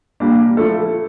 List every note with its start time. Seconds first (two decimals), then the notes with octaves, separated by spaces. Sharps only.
0.20 A#2 G3 A#3 D4
0.57 F3 A3 E4 A4